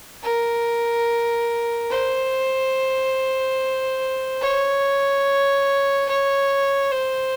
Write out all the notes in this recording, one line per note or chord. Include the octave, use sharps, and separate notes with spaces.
A#4
C5
C#5
C#5
C5